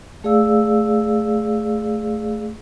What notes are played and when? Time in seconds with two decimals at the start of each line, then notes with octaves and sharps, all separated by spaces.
0.24 A3 G#4 D5 F5 E6